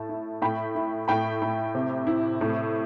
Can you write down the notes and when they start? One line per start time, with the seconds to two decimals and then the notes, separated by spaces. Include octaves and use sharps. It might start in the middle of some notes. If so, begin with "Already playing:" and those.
Already playing: A2 A5
0.09 E4
0.42 A2 G5 B5
0.75 E4
1.08 A2 G5 B5
1.42 A2
1.75 C3
2.07 E4
2.41 A2